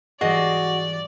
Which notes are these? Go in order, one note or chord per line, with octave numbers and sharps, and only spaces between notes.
G#2 E3 G3 F#4 G#4 D5 D#5